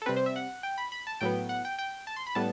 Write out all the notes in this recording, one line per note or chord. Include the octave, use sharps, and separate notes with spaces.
A4
C3 G3 C4 B4
C5
E5
F#5
G5
B5
B5
A5
A2 F#3 B3 G5
F#5
G5
G5
A5
C6
B5
A2 G3 B3 A5